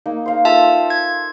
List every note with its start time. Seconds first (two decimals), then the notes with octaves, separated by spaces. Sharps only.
0.06 A#3 D#4
0.26 C5 F5 A#5
0.45 F4 A4 E5 A5
0.90 G#6